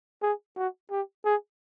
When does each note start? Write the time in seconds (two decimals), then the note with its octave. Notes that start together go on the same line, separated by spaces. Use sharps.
0.22 G#4
0.57 F#4
0.91 G4
1.25 G#4